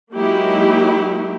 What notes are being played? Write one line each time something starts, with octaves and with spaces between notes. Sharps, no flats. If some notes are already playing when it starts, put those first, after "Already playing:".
F#3 G#3 A#3 D#4 E4 G4